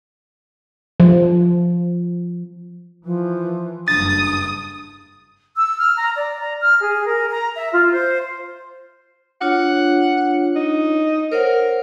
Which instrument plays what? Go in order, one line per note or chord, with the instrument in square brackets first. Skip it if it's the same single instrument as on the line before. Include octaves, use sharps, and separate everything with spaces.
[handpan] F3
[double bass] E3 [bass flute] F3
[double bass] F#1 G2 [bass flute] D4 [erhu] D#6 [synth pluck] A6
[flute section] E6
F6
A#5
D5
A#5
F6
G#4
A#4
A#5
E5
F4
C5
[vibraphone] D4 F4 C#5 [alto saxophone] F#5
[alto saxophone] D#4
[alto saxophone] A#4 [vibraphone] C5 C#5 F#5